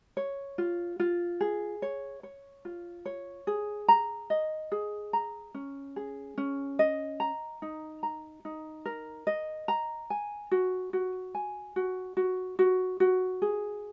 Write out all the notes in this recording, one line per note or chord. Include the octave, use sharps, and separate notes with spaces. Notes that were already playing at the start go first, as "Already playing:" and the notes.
C#5
F4
F4
G#4
C#5
C#5
F4
C#5
G#4
A#5
D#5
G#4
A#5
C#4
G#4
C#4
D#5
A#5
D#4
A#5
D#4
A#4
D#5
A#5
G#5
F#4
F#4
G#5
F#4
F#4
F#4
F#4
G#4